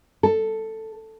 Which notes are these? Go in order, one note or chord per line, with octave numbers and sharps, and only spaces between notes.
A4